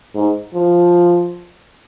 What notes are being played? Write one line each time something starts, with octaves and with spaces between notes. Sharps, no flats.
G#2
F3